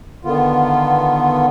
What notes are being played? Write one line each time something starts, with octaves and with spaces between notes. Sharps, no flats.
D3 D#3 B3 F4